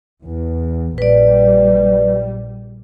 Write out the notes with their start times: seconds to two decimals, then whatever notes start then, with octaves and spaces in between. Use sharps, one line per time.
0.24 E2
0.98 A#1 G3 B4 D5